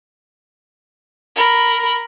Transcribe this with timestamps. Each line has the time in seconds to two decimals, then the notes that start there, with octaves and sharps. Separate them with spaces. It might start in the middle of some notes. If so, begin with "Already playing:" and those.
1.36 A#4 B5